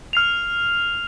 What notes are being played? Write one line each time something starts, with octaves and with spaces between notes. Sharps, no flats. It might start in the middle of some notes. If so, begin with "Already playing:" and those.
F6 C7 F7